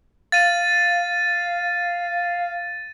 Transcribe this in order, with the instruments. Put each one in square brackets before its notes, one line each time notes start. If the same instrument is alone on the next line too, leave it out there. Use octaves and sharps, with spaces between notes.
[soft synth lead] F5 [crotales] A6 D#7